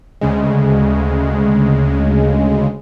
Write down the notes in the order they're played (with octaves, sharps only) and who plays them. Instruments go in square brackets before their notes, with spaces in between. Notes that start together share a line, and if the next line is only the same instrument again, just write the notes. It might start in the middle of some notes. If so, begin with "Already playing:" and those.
[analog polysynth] D2 C#3 G#3